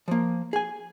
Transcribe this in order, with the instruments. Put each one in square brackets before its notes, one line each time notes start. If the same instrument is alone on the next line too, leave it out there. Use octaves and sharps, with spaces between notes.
[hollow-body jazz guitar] F3 A#3
G#4 G#5